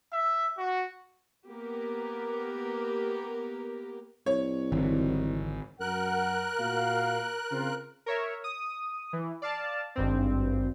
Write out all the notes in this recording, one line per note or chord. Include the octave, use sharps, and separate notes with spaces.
E5
F#4
A#3 B3 G4 A#4
C2 C#5
G#1 D3 E3
F#2 A#4 F#5 F#6
A#2 F#4 F5
C#3 C4 F4
A#4 C#5 E5
D#6
E3
D5 F5 A5
G#1 G2 C4